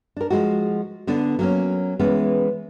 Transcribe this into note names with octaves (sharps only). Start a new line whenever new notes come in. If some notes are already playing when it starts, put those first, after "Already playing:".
D4 A#4
F3 G#3 F#4
D3 B3 D4
F#3 A#3 C#4
E3 G#3 B3 C#4